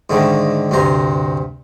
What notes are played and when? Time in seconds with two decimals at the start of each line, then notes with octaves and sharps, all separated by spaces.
0.10 G#2 D3 D#3 A3 D4
0.71 D2 G2 C3 C5 A#5